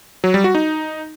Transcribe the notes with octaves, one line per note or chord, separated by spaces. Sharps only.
F#3
G3
F#4
D#4